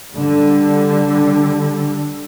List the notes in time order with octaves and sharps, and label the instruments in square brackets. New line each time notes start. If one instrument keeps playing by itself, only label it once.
[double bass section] D3 G3